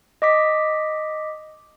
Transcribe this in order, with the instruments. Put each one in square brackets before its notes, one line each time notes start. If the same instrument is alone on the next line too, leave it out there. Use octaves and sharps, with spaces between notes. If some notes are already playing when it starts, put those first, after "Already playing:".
[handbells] D#5 D6 B6